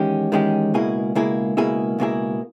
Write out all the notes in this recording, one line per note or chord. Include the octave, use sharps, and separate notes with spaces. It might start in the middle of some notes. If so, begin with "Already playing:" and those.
Already playing: E2 D#3 G#3 C#4 G4
E2 D#3 G#3 C#4 G4
C#2 B2 A#3 E4 G#4
C#2 B2 A#3 E4 G#4
C#2 B2 A#3 E4 G#4
C#2 B2 A#3 E4 G#4